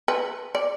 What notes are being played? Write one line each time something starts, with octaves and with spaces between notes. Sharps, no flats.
B4
D5